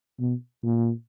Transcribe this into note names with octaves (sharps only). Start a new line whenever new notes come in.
B2
A#2